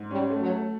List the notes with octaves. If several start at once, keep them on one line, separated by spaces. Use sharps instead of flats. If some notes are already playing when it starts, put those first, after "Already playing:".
Already playing: G#2
G3 C#4
A3
F#3
A3